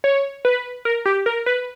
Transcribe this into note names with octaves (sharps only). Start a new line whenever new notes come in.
C#5
B4
A#4
G4
A#4
B4